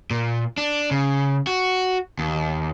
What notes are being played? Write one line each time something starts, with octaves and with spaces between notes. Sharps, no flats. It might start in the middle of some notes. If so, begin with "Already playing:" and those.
A#2
D4
C#3
F#4
D#2